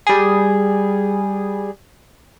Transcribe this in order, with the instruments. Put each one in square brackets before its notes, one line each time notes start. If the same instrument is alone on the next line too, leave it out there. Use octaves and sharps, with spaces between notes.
[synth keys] G3 G#4